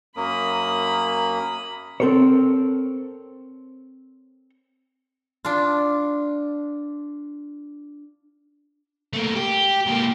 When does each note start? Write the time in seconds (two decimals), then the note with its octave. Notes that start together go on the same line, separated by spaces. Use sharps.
0.17 F#2 A#3 C#4 A#4 B5 D#6
2.00 C4 A4 A#4 C5 C#5
5.45 D4 F4
9.13 A3 A#3
9.36 G4
9.87 G#2 A#3